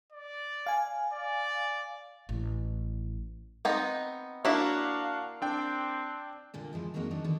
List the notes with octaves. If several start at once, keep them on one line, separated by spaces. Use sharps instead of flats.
D5
F5 G#5
D5
A1
B3 C4 D#4
A#3 D4 E4 F#4 E5 F5
C4 D4 G5
A#2 D3 A#3
A#2 F3 G#3 E4
F2 F#3 G#3 A#3 D#4 F#5
D#3 F#3 D4 D#4
D3 D#3